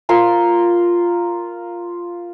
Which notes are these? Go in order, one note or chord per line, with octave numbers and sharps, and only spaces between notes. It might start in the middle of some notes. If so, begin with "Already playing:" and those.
F4 A#4 C6